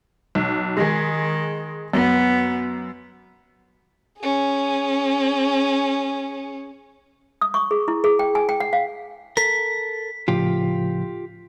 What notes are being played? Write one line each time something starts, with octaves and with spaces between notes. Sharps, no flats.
B1
D#3 G#3 G#4
F#2 B3
C#4 G#4
D#6
C#6
G#4
E4
G#4
G5
G#5
G5
F#5
F5
A4 A#4 B6
A2 C#3 F3 F4 G4